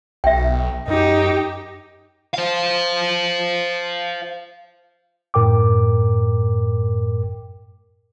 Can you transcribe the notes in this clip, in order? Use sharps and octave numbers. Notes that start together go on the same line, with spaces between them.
B1 E5 G5
F#2 D#4 G4
C5 F5
F#2 A2 A#4 G5 D6